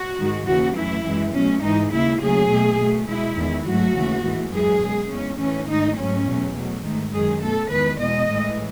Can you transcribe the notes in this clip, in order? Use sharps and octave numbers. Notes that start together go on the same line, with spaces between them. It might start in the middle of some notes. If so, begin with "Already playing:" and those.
Already playing: F#4
G#2 D#3 G#3
D#2 C#3 E3 F#4
F#2 E3 A3 E4
F#2 E3 G#3
B2 F#3 A3 C#4
G#2 E3 G#3 D#4
D#2 C#3 G#3 E4
D#2 C#3 F#3 A3 G#4
B2 A3
B2 A3
B2 G#3 E4
E2 D#3 G#3
G#2 F#3 A3 F#4
D#2 C#3 E3 A3
A2 E3 G#3
F#2 E3 G#3 G#4
B2 G#3
E2 C#3 G#3 C#4
A2 E3 A3 C#4
G#2 D#3 A3 D#4
G#2 F#3 A3 C#4
E2 B2 F#3 A3
B2 F#3 A3
G#2 D#3 A3
F#2 D#3 G#3 G#4
B2 A3 A4
E2 D#3 G#3 B4
E2 B2 G#3 D#5
A2 E3 G#3